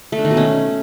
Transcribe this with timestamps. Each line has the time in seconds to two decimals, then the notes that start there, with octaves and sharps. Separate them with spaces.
0.12 A3
0.19 D4
0.25 D#3
0.31 B2
0.37 C#4